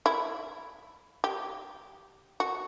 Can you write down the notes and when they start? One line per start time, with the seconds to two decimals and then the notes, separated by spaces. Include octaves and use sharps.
0.06 E4
1.24 G4
2.40 F#4